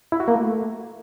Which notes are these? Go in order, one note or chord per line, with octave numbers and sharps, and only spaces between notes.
E4
F#4
A#3
A3